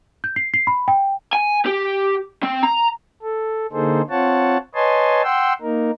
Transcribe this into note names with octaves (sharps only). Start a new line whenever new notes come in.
G6
C7
C7
B5
G5
G#5
G4
C4
A#5
A4
D3 A#3 D#4 G#4 A4 C5
C4 F4 C#5 F#5 A5
B4 C#5 D#5 G#5 A5 C6
F#5 G5 C6 E6
A#3 D#4 A#4